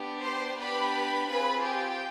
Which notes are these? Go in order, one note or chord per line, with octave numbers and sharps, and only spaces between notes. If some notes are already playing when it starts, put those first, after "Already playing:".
Already playing: B3 D4 G4
C5 C6
B3 D4 G4 B4 B5
C4 F4 G#4 B4 B5
G4 G5